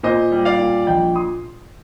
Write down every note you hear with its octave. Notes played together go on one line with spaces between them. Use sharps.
A#2 C5 D#5
G3
D5 F5
A#2
A#1 D#5 G5
C6 D#6